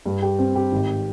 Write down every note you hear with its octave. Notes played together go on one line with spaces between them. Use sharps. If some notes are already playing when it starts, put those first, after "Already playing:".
G2
G4
C4
G4
G#1